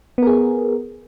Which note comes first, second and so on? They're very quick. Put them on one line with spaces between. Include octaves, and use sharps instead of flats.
B3 A#4 G#4